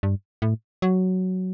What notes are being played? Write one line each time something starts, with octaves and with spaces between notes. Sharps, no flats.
G2
A2
F#3